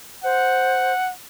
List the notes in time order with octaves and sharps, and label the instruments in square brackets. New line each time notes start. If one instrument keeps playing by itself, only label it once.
[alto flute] C5 [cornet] F#5